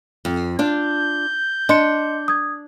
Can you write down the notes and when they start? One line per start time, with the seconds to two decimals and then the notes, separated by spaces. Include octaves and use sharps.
0.25 F2
0.59 D4 F4 G6
1.69 D4 D#5 C6 C#7
2.28 D#6 G#6